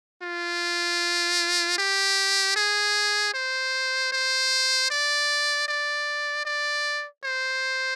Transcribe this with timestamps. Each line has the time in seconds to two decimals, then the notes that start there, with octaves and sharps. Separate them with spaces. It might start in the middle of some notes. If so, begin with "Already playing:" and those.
0.22 F4
1.78 G4
2.56 G#4
3.34 C5
4.12 C5
4.90 D5
5.68 D5
6.45 D5
7.24 C5